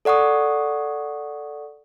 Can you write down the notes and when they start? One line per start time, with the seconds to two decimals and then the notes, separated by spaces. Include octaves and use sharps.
0.05 A4 D5 F#5 C#6 D#6